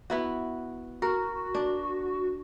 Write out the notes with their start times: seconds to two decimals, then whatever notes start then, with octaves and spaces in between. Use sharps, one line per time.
0.10 B3 E4 F#4
1.02 F#4 A#4
1.55 D4